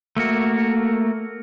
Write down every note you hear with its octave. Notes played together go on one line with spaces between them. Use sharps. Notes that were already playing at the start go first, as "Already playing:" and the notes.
A3 A#3 F#4